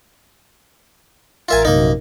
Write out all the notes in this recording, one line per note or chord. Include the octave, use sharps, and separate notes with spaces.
A1 F4 A#4 E5 G#5 A6
A#1 F#2 C3 A#3 D#4